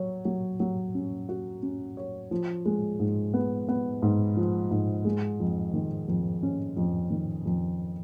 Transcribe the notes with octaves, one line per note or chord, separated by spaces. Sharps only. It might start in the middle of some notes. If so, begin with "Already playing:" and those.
Already playing: F#3 C#5
F#3
F#3
C#4
F#4
C#4
C#5
F3
G#3
G#2
B3
B3
G#2
F3
G#2
G#3
F2
D#3
F2
C#4
F2
D#3
F2